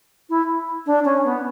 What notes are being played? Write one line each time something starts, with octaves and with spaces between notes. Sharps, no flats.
E4
D4
C#4
B3